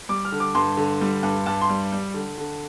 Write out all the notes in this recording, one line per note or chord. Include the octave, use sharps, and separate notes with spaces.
G3 D6
F6
D3
D6
G2 C6
D3
G3
G2
G2 A5
C6
G3
G3
D3
D3